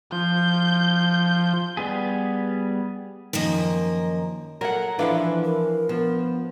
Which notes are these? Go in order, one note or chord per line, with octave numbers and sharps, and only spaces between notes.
F3 G6
G3 B3 G#4
F#2 D#3 F3 A#3 D#5
F#3 A#3 A4 A#4 F#5
E3 F3 D4 E4 A4 B4 E5 F5
A#4
F3 B3